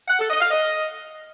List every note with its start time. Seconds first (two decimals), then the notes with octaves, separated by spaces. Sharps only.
0.08 F#5
0.19 A4
0.30 D#5
0.40 F5
0.51 D#5